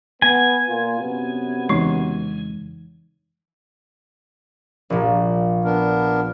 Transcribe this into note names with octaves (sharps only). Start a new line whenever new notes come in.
B3 G#5
A#2 A#3 F4
F#2 C3 B3
F2 C#3 E3 G#3 D#4
A#1 A#2
B3 D4 A#4